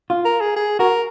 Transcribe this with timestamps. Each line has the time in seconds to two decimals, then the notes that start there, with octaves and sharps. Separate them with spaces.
0.10 F4
0.25 A#4
0.41 G#4
0.56 G#4
0.79 F#4 A#4